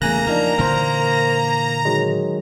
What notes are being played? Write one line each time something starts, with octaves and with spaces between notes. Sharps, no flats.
E2 C#3 A3 A#3 G#5 A#5 F#6
F3 D4 D#4 A#4
A#2 D3 E3 A#4 C5
D#3 F#3 G#3